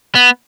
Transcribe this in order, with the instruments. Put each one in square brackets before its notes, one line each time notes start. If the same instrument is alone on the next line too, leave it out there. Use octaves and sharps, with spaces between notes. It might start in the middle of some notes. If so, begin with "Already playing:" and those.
[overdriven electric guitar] B3